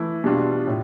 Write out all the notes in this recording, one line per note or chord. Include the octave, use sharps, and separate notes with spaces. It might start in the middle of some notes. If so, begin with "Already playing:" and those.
Already playing: E3 A3 E4
B2 G3 D4 F4
A2